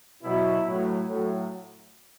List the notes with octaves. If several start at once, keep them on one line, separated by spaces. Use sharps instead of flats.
B2 F#3 E4
A2 F#3
A2 F#3